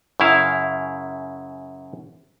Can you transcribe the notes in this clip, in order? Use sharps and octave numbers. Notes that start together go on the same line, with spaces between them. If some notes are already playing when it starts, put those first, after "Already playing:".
F#2 C#3 E4 F5